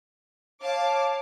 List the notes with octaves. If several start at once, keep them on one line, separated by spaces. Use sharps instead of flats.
C#5 F5 A5 D6